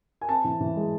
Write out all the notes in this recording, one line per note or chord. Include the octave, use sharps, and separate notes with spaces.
G#5
C4 A5
E3
E3
G#3